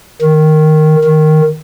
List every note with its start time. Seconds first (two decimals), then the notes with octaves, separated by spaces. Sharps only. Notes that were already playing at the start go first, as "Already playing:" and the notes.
0.21 D#3
1.04 D#3